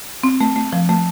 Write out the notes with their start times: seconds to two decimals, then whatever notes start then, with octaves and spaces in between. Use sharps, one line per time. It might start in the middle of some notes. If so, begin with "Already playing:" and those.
0.23 C4
0.41 A3
0.56 A3
0.73 F3
0.89 A3